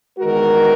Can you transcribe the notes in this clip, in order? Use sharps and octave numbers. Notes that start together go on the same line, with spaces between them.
E2 D#3 G#3 F#4 A#4